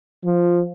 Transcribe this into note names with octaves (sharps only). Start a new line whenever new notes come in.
F3